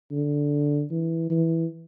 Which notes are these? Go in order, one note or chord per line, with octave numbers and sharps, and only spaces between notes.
D3
E3
E3